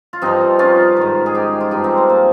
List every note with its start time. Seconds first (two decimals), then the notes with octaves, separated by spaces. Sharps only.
0.13 F4
0.22 G2 F3 C4 D#4
0.59 C#4 F4
0.96 G#2 D#3
1.26 G#4
1.35 D#4 G4
1.60 F4
1.71 G2 F3 D#4 G4
1.84 G#3 C4
1.97 A#3
2.10 A#3